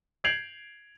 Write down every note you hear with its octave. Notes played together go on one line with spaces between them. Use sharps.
G6 G#6 C7 D7 F7 F#7